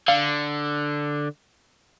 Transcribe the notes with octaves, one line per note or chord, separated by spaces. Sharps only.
D3 F5